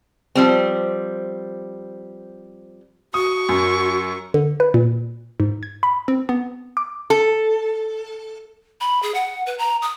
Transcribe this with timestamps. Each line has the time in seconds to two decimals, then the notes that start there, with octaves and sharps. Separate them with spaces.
0.35 F3 G3 C4
3.14 F#4 C#6 D#6
3.49 F#2
4.34 D3
4.60 B4
4.74 A#2
5.40 G#2
5.63 G#6
5.83 B5
6.08 C4
6.29 B3
6.77 D6
7.10 A4
8.81 B5
9.02 G#4
9.14 F#5
9.46 B4
9.58 A#5
9.82 D#6